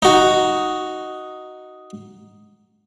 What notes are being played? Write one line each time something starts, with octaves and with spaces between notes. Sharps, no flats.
D#4 F#4